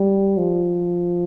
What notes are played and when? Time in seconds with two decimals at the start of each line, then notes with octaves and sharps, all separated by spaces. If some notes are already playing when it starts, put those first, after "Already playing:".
Already playing: G3
0.37 F3